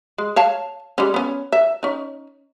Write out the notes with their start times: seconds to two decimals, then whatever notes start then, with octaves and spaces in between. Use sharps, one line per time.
0.18 G#3
0.36 C#5 F5 A5
0.98 G3 G#3 C#4
1.14 B3 C#4
1.52 E5
1.83 C#4 D#4